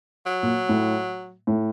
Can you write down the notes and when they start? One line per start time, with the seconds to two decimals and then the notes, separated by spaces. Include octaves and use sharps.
0.26 F#3
0.43 A#2
0.69 A2
1.47 A2